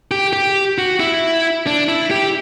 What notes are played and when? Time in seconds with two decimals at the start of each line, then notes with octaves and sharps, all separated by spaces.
0.11 G4
0.33 G4
0.78 F#4
1.00 E4
1.67 D4
1.89 E4
2.11 G4